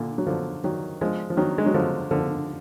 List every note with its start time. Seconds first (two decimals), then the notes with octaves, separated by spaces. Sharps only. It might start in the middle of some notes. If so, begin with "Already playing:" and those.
Already playing: A#2 D3
0.18 F#3
0.27 D3 F3
0.64 D#3 F#3
1.01 F3 G#3
1.30 F3
1.37 D#3 F#3
1.58 G#3
1.66 F#3
1.74 D3 F3
2.11 D3 F3